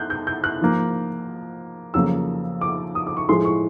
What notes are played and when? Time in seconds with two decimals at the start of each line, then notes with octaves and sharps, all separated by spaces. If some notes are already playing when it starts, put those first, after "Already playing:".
Already playing: F#6 G6
0.10 G6
0.27 G6
0.44 F#6
0.61 G#2 F3 A#3
1.94 F2 C#3 F#3 A#3 E6
2.61 D6
2.95 D#6
3.07 D6
3.17 C#6
3.29 A2 F3 G#3 C6
3.45 C#6